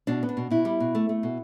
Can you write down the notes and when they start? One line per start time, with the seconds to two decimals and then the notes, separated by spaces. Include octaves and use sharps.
0.07 B2 D4
0.23 B3
0.29 D4
0.37 B2
0.51 B2 E4
0.65 G3
0.80 B2
0.95 A3
1.09 A3
1.23 B2